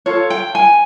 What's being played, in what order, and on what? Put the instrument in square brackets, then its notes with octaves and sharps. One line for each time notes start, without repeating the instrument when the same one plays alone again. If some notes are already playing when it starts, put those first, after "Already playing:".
[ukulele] F4 A4 C#5
G5
G#5